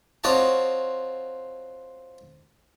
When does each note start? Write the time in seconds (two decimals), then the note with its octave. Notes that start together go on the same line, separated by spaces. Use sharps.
0.24 C4 F4 F#4 C#5 D#5 A5